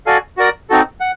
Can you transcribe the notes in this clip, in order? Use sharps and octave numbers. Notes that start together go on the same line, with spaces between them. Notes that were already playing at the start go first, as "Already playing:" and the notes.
F#4 A4 D5 F5 G#5
F#4 A#4 D5
C4 D#4 F#4 A4
F#5